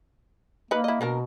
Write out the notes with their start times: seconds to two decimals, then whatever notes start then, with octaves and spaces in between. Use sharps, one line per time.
0.71 A#3 D#4 B4 B5
0.84 E4 D#5
1.01 B2 A#3 D4 A#4